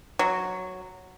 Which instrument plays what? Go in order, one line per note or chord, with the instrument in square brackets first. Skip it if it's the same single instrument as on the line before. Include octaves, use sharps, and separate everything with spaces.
[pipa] F#3